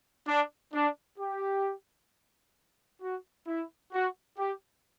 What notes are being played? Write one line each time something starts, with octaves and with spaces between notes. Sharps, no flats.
D4
D4
G4
F#4
E4
F#4
G4